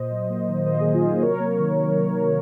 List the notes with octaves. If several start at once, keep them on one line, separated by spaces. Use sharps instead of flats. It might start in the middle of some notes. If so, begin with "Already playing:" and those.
Already playing: A#2 C5 D#5
F#3
A#3
D#3
A#3 C5 D#5
D#3 G#4 C5
F4 G#4
F#3 C5 D#5
C3 A#4 C#5
A#3
D#3
D#3
C3
A#3